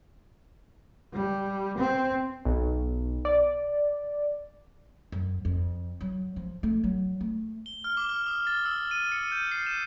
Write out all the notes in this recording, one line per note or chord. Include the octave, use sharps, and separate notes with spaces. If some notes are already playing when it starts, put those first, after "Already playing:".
G3
C4
B1
D5
F#2
F2
F#3
F3
A3
F#3
A3
G7
F6
D6
F6
D#6
A6
E6
D#7
C#7
G6
C7
E7